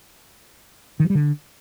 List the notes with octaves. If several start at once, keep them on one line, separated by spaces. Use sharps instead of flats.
D#3
F3
G3
D3